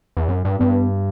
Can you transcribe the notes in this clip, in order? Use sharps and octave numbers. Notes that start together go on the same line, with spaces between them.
E2
F#2
G2
G2 B3